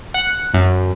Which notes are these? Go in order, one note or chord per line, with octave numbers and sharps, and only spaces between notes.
F#5
F#2